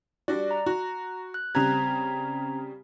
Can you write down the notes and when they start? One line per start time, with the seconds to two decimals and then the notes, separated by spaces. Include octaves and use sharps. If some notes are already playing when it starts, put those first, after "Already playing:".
0.28 G3 D4 F#4 D5
0.51 A#5
0.66 F#4
1.34 F#6
1.55 C#3 G3 C4 A#5 G#6